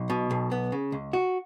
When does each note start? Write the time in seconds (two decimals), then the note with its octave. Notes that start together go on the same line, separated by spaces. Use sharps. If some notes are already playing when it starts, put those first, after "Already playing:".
Already playing: B1
0.10 B2
0.31 B1
0.51 B3
0.72 C#3
0.92 C#2
1.13 F#4